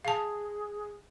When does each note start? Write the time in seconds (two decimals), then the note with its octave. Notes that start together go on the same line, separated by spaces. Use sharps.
0.05 G#4 F5 A5